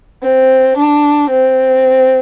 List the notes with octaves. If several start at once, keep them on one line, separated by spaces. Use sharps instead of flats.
C4
D4
C4